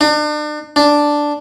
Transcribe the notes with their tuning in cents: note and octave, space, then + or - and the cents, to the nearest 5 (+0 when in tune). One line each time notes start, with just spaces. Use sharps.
D4 +40
D4 +0